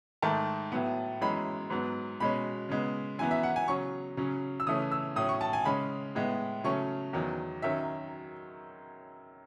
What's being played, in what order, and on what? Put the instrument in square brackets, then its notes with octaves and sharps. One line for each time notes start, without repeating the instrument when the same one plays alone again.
[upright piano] G#2 D#3 A3 A5
A2 F#3 B3
F#2 E3 G#3 C#4 B5
G#2 F#3 B3
B2 G#3 C#4 B5
C#3 G#3 B3
F#2 E3 B3 G#5
E5
F#5
G#5
C#3 F#3 C#4 C#6
C#3 F#3 C#4
E6
C#3 E3 A3 C#4 D#6
E6
A2 F#3 C#4 D#6
C#6
A5
G#5
C#3 G#3 C#4 B5
A2 G#3 B3
C#3 F#3 A3 C#4 C#6
E2 D#3 F#3
F#2 D#3 F#3 C#4 E5